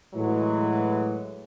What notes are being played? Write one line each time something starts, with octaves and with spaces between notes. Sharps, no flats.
A2 E3 F#3 G#3